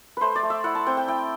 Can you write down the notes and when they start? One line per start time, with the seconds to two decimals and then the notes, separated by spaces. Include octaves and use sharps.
0.17 A3 B4 C5
0.35 D5
0.43 A3
0.50 E5
0.64 E4 F#5
0.75 A5
0.86 C4 G5
0.97 G5
1.08 E4 G5